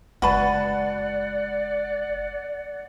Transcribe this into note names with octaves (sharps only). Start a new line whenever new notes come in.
F#1 G#3 F#4 B4 D5 F#5 A5